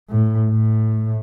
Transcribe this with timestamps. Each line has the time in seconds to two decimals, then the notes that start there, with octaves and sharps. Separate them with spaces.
0.10 A2
0.50 A2